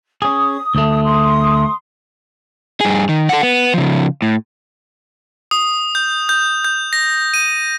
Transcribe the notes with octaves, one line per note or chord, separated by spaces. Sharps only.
C#4 G#4 D#6
D2 A3
C6 D#6
G2 G#4
D#3
A4 F#5
B3
C#3 F3
A2
D#6
G6
G6
G6
A#6
D#7